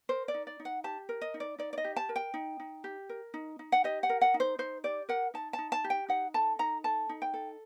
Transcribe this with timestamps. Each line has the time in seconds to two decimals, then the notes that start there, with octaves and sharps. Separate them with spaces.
0.09 A#4 C5
0.28 D5
0.34 D#4
0.47 D5
0.60 D#4
0.65 F#5
0.84 G4 A5
1.09 A#4
1.21 D#5
1.34 D#4
1.40 D5
1.58 D#4 D5
1.73 D5
1.78 D#5
1.84 G4
1.96 A5
2.09 A#4
2.16 G5
2.34 D#4
2.60 D#4
2.84 G4
3.09 A#4
3.34 D#4
3.59 D#4
3.72 F#5
3.84 G4 D#5
4.03 F#5
4.09 A#4
4.21 F#5
4.34 D#4
4.40 C5
4.59 D#4 C5
4.84 G4 D5
5.09 A#4 F#5
5.34 D#4 A5
5.53 A5
5.58 D#4
5.72 A5
5.84 G4
5.90 G5
6.09 D#4 F#5
6.34 A4 A5
6.59 D#4 A#5
6.84 A4 A5
7.09 D#4
7.22 G5
7.34 A4